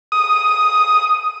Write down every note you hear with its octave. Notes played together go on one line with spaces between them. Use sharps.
D#6